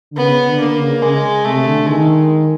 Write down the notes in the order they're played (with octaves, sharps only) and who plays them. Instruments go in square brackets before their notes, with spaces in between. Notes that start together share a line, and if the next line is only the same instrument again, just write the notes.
[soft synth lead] D3
[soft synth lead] C#3 [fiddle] B3
[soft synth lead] D3
[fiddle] A#3
[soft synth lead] C#3
[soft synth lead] C#3 [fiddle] G#3
[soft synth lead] C3 [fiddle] A3
[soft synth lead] D3
[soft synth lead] D#3 [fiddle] G#3